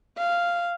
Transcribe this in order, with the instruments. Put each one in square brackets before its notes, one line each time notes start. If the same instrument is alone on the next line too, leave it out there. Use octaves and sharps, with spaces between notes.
[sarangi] F5